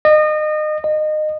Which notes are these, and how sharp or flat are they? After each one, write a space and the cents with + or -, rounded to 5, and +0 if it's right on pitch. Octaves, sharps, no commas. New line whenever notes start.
D#5 -30
D#5 -25